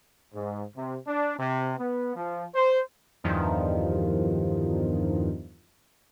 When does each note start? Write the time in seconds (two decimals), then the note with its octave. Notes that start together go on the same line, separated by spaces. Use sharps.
0.34 G#2
0.76 C3
1.07 D4
1.38 C3
1.78 B3
2.15 F3
2.55 C5
3.24 E2 G2 D#3 F3